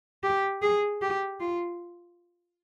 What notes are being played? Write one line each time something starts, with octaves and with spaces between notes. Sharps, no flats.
G4
G#4
G4
F4